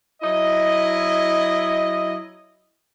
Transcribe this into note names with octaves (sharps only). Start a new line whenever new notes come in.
F#3 E4 D#5